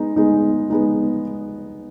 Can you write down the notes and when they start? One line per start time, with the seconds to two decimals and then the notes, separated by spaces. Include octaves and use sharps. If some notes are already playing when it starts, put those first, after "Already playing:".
Already playing: G#3 B3 D#4
0.16 G#3 B3 D#4
0.70 G#3 B3 D#4